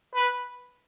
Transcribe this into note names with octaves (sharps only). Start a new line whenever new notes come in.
B4